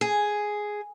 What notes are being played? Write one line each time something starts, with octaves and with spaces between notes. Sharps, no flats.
G#4